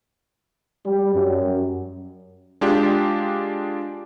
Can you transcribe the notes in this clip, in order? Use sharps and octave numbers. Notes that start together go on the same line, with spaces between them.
G3
F#2
G#3 D4 F4 G4